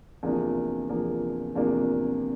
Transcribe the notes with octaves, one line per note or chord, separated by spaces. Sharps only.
E2 C3 F3 A#3 D4
E2 C3 F3 A#3 D4
E2 C3 F3 A#3 D4